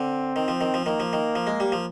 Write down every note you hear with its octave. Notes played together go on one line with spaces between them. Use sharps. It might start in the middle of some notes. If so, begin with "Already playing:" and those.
Already playing: D3 C4
D#3
F3
D#3
F3
D#3 A#3
F3
D#3
F3
G#3
G3
F3